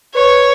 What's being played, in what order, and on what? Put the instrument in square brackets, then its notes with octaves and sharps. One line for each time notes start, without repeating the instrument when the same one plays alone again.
[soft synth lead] B4 [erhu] C#5